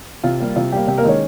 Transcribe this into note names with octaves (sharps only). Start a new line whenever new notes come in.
C3 F4
G3 A#3
C3 F4
G3 A#3 G4
C3 G4
A#3 A#4
D#3 G#3 C#4 C#5